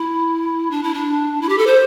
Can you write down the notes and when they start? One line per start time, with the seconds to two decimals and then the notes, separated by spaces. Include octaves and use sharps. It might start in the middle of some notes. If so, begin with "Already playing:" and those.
Already playing: E4
0.71 D4
0.83 E4
0.94 D4
1.42 E4
1.49 G4
1.58 A4
1.67 C5